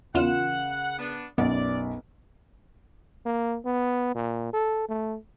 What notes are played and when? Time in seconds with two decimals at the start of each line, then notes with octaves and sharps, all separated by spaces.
0.14 E2 C#3 F4 A#4 F#5 E7
0.98 B3 D4
1.38 B1 F#2 B3 D5
3.25 A#3
3.65 B3
4.15 A#2
4.53 A4
4.89 A3